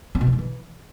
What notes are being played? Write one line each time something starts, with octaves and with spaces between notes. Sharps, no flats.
C4
B2
G3
G#3
E3